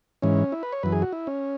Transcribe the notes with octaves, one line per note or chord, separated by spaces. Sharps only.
G#2 E3 C#4
E4
B4
C#5
F#2 E3 B4
G#4
F#4
E4
C#4